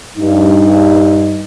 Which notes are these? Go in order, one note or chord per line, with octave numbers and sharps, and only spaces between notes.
G2 D#4